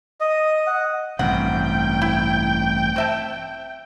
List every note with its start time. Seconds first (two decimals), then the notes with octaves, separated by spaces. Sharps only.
0.21 D#5
0.67 F#5
1.19 A1 G2 C3 F#5 G5
2.02 E4
2.96 C4 E5 A5